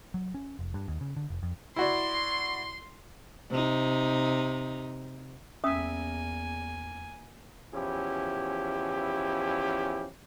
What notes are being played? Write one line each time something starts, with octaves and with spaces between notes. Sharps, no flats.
F#3
C#4
F1
G2
D#2
C#3
D3
F1
F2
E4 F#4 D5 C6
C3 D#4
E2 A#3 C#4 E5 G#5 D#6
E2 F3 C#4 E4 G4